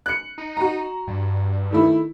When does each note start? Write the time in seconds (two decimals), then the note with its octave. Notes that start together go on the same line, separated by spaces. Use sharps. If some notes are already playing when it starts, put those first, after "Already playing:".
0.06 F#6 C#7
0.38 D#4
0.57 F#4 A#5
1.07 G2
1.71 D#3 A3 E4